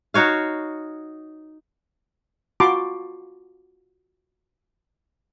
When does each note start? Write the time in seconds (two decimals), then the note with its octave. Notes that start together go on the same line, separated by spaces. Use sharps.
0.14 D#4 F#4 C#5 F5
2.60 F4 F#4 A5 B5 C6 D6